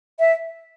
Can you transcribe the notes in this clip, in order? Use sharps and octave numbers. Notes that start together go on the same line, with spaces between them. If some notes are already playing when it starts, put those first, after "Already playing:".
E5